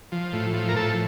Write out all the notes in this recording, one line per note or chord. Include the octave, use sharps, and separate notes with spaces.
F3
A2
F3
A#4
A2 A4